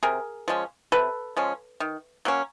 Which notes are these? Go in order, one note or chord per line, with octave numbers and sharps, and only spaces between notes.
C3 G#4 A#4
F3 G#3 C#4
C3 A4 B4
F3 G#3 C#4
D#3
F#3 A#3 C#4